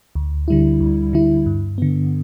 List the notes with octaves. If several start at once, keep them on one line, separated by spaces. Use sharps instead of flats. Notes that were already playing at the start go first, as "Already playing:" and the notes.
D2
D3 G3 E4
D2
D3 G3 E4
G2
D3 B3